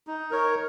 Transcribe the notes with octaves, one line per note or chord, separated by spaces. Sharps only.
D#4
A#4 C#5